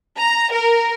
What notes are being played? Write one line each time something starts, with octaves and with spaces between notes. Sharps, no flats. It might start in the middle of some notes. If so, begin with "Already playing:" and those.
A#5
A#4